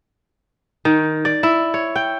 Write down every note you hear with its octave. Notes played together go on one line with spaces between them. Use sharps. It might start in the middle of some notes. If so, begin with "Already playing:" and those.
D#3
D5
E4
C#5
G5